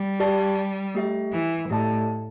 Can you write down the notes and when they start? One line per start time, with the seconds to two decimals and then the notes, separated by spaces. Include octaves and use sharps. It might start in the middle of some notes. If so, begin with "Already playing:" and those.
Already playing: G3
0.20 G4 D5 A5
0.95 A3 G4 E5
1.32 E3
1.69 A2 A3 G4 D5 A5